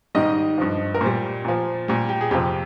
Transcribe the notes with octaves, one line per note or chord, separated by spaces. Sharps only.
G#2 D#3 G3 D#5
G2 F3
A#4
A#2 G3 C5
A#2 F3
A#2 G3
G4
G#4
F2 C3 F3 G4